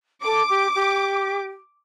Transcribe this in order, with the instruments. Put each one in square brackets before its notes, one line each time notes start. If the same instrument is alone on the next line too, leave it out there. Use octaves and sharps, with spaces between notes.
[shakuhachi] A4 [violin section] D6
[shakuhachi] G4
G4